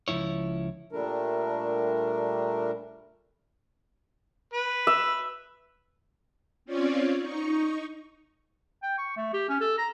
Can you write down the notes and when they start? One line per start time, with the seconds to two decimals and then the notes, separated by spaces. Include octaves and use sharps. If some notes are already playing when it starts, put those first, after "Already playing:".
0.08 C#2 G#2 F3 E4 C#5
0.92 A#2 G3 A3 D4 A#4
4.53 B4
4.87 E5
6.65 C4 C#4 F4 C#5 D5
7.19 D#4 C#6
8.83 G5
8.98 C#6
9.17 A3
9.34 G4
9.49 C#4
9.61 A4
9.78 A#5